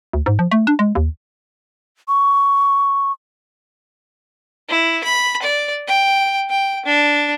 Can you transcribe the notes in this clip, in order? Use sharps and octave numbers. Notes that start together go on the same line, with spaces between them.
D2
G#2
F3
A3
D4
G#3
D#2
C#6
E4
B5
D5
G5
G5
D4